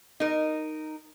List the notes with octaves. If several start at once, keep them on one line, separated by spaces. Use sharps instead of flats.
D#4 A#4